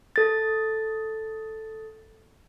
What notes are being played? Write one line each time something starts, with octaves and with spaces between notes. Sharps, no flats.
A4 A6